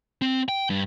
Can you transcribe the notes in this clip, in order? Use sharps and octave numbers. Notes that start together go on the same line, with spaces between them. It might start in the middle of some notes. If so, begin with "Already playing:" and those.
C4
G5
G2